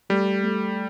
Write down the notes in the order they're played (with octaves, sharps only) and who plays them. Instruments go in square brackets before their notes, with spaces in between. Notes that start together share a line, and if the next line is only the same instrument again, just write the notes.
[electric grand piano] G3 [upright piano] A3
[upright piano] A3